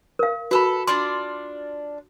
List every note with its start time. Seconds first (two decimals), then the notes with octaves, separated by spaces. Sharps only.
0.19 A#4 F5
0.51 F#4 A4 B4 B5
0.87 D4 F4 D5 C6